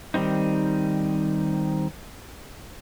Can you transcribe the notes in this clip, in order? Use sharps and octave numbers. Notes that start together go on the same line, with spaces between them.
D#3 G3 G#3 C4 D#4